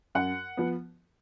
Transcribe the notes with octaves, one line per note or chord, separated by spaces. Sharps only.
F#2 F#5
F3 B3